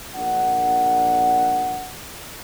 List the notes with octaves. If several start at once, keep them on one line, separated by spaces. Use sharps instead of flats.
A#1 D4 A#4 F#5